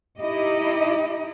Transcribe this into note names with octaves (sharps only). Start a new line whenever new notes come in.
D#4 E4 G4 D#5